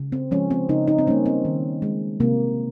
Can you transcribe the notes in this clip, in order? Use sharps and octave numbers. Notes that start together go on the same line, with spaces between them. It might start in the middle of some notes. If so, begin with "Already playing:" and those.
Already playing: C#3
C4
F3 G#3 C#4
C4
C#3 D#4
D#4
C4
G3 A#3 C#4
C4
D#3
G#3
C3 A#3